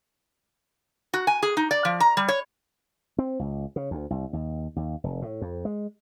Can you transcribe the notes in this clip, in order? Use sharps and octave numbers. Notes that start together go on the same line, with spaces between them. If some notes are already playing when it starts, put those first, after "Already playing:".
F#4
G#5
G#4
D#4
D5
F3
A#5
G3
C#5
C4
C#2
C#3
D2
C2
D#2
D#2
F1
A2
F2
G#3